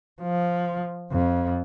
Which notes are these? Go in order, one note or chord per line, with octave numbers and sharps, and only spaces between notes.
F3
F2